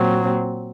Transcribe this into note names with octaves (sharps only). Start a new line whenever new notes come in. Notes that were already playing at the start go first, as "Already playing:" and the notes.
Already playing: A#2 F#3 C4